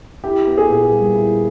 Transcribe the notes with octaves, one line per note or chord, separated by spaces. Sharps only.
E4 G4
B3
G#4
A#2
G3
E4